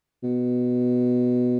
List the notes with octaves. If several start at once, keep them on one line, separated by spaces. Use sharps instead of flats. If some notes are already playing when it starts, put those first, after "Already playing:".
B2